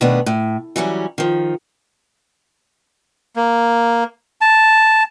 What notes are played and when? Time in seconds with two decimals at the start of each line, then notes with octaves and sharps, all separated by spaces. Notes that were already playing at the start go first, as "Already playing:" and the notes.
0.01 B2 D#3 A3 B3 D4
0.26 A2
0.76 E3 F#3 G3 C#4
1.18 D#3 F3
3.36 A#3
4.41 A5